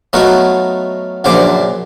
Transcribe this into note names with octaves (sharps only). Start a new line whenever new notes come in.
F#3 A3 B3 D#4 F4 F#4
A#1 F#2 A#2 D3 C5 D6